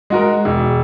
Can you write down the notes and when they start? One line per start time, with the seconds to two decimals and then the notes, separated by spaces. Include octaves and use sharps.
0.10 G#3 F#4 A#4
0.45 E1